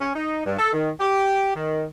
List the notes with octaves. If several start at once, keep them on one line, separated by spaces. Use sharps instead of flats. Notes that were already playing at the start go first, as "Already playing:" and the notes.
C#4
D#4
G2
A4
D#3
G4
D#3